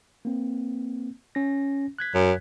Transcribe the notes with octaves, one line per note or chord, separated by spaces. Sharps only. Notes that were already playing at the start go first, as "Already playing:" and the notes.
A#3 C4
C#4 A#6
F#6 G#6 B6
F#2